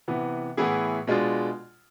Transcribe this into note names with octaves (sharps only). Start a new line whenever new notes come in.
C3 E3 B3
A2 E3 B3 E4 G#4
B2 G#3 D4 F4